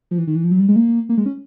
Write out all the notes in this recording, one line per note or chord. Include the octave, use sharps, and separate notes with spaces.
F3
E3
D#3
E3
F3
F#3
G3
G#3
A#3
A#3
G#3
C#4